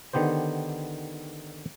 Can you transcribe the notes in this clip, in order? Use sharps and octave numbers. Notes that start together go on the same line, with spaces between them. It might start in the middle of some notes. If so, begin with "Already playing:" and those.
D3 D#3 B3 G4 C5